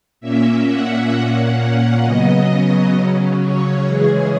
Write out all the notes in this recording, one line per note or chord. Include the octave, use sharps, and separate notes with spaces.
A#2 A#3 C#4 E5
F#5
A#2 A#3 C#4 F#5
C#3 F#3 B3 D#5
C#3 F#3 C#4
C#5
C#3 E3 G#3 C#4 G#4